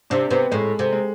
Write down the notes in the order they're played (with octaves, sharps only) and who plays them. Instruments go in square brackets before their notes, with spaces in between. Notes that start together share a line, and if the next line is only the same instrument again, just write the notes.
[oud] C3 [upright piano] D4
[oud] C3 [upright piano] B3
[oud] A2 [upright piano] G#3
[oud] C3
[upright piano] G#3